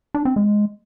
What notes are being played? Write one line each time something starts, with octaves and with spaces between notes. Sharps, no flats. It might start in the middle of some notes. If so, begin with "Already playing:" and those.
D4
C4
G#3